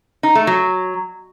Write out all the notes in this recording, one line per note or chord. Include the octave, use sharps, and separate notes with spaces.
D#4
A3
F#3